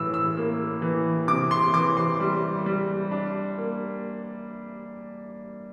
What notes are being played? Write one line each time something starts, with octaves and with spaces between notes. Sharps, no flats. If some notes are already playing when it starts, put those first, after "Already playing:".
Already playing: A2 E3 E6
E6
A#3
E3
C3 D6
C6
E3 D6
C6
G3
G3
D4
A#3